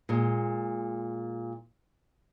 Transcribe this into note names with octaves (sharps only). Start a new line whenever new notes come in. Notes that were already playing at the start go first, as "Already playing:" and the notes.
A#2 G#3